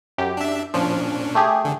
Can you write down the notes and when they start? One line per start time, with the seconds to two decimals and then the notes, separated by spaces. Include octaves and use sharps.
0.18 F#2 G4
0.37 D4 E5
0.74 A#2 F3 C#4 D4
1.35 A3 G4 G#4
1.65 D3